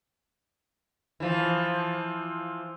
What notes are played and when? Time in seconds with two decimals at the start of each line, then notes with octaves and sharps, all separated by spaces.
1.20 E3 F3